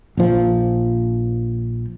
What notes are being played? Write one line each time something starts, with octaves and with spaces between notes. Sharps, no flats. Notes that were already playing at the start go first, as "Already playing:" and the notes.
A#1 F3